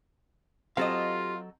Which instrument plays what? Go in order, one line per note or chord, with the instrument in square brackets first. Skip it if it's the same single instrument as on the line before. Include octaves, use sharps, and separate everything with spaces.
[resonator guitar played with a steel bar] F#3 A4 D#5 [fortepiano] C4 [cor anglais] F4 [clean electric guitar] G4 F5